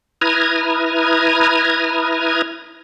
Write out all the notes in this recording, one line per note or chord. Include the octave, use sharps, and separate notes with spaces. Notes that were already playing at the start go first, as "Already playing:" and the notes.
E4 B4 A#5 D#6 F6 G#6